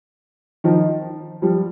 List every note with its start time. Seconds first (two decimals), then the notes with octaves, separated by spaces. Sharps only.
0.64 D#3 F3
1.42 F3 G3